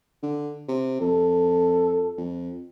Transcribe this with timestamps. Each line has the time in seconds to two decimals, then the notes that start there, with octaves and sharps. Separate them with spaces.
0.23 D3
0.68 C3
1.01 F2 A4
2.18 F2